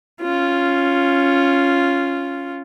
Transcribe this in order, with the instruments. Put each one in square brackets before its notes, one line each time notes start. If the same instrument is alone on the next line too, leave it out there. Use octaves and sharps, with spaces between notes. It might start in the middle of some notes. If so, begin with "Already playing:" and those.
[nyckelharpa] C#4 F4